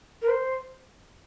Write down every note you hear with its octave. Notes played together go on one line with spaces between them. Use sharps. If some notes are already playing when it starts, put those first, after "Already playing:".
A#4
C5